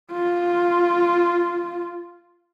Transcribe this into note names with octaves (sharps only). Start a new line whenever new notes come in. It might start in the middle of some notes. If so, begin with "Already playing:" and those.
F4